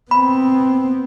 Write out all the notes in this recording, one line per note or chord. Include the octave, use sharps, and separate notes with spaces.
B3 C4 B5